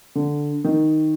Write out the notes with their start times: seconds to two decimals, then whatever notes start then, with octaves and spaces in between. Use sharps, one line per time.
0.15 D3
0.64 D#3